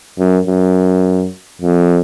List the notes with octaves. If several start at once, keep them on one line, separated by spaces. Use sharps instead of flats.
F#2
F#2
F2